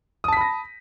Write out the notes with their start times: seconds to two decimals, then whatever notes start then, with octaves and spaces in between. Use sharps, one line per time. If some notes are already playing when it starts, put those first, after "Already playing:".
0.24 D#6
0.28 A5
0.33 B6
0.37 B5
0.41 A#6